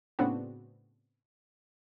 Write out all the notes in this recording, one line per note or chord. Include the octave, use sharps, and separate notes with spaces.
A2 C#3 B3 C4 D4 F#4